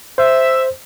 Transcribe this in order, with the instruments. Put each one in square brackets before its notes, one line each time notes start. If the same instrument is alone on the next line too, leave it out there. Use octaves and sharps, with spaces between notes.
[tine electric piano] C5 [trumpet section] E5